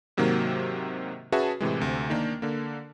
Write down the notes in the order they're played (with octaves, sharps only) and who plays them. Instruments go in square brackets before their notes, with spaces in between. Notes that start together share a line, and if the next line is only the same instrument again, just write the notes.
[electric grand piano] G#2 C3 D#3 F#3 A#3
C#4 F#4 G#4 B4 E5 A5
A2 C3 E3 G#3
D2 C3
D#3 A#3 D4
D3 A#3